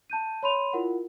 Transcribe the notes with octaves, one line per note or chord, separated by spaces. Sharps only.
A5 G6 D#7
C#5 B5 C6 D#7 F7
E4 F4 A#4 F#5